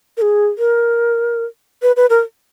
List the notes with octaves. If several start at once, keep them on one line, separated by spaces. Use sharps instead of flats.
A#4
G#4
A#4
B4
B4
A#4